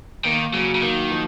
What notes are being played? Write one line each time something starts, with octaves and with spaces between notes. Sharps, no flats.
D#3 A#3
C#3 F#3
C#3
D#3 A#3
F3